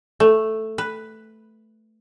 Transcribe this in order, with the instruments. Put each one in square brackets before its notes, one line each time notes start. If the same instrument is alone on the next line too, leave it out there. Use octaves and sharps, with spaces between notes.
[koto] A3
B4